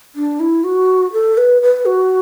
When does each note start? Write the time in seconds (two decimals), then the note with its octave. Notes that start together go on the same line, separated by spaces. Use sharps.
0.16 D4
0.40 E4
0.64 F#4
1.13 A4
1.38 B4
1.62 B4
1.86 F#4